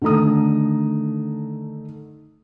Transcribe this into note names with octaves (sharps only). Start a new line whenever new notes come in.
D3 D#3 A3 A#5 D#6